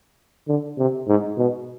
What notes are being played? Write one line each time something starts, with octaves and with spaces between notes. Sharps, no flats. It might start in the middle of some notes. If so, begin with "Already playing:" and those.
D3
C3
G#2
B2